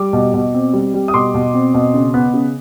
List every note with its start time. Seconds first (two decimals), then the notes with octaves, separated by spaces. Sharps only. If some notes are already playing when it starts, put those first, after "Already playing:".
Already playing: G3 D6
0.13 B2
0.34 B2
0.54 C4
0.73 G3
0.94 G3
1.08 D#6
1.14 B2 C6 D6
1.34 B2
1.54 C4
1.74 B2
1.94 C#3
2.14 B3
2.34 C#3